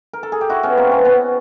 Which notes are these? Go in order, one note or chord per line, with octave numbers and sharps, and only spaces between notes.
A#4
A4
G#4
G4
E4 F#4
B3 C#4
A#3 C4
B3 C#4
B3 C#4